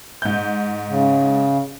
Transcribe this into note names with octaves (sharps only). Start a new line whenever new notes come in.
G#2 G6
C#3